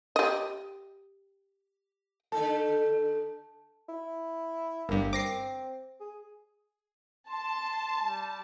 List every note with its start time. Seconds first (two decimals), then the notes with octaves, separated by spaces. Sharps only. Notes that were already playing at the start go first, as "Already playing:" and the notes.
0.16 G4 D#5
2.32 D3 D#4 A4 A5
3.88 E4
4.89 G1 G2 A#3
5.13 C4 D6 A#6 C7
6.01 G#4
7.29 A5 C6
8.02 G3